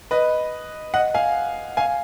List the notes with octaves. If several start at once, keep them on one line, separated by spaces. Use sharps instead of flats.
B4 D#5
D#5 F#5
F5 G#5
F5 G#5